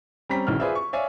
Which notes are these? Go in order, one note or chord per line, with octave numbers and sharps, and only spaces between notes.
G3 C4 C#4 A#5 B6
E1 B1 E3 C#4 F6
F4 G#4 B4 C5 D5 E5
C#6
C#5 D5 E5 F5 G#5